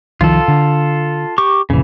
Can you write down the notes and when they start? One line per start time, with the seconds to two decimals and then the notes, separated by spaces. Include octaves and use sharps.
0.21 C2 D#3 F3 F4 A4
0.48 D3
1.38 G4 C#6 D6
1.70 F1 A#1 C#3 E3